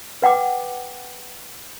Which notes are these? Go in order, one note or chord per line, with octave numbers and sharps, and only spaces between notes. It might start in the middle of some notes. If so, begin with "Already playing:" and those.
B4 F#5 G5 D6